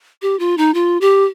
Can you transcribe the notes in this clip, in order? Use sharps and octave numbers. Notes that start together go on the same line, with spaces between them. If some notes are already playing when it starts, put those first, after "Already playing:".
G4
F4
D#4
F4
G4